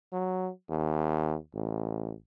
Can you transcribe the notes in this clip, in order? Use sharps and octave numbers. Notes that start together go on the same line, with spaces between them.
F#3
D#2
A1